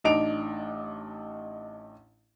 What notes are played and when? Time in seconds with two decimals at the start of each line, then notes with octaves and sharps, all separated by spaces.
0.04 A1 D4 D#4 D7 F7